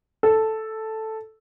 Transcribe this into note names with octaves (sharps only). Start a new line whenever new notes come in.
A4